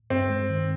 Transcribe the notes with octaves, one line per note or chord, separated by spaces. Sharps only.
G2 C4
G#3
D#3